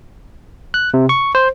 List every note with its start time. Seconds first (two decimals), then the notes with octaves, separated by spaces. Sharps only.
0.74 F#6
0.94 C3
1.09 C#6
1.35 C5